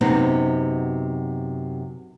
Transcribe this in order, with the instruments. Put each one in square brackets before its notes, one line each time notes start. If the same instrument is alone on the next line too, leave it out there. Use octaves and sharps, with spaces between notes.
[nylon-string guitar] F#2 C3 B3 C4 D#4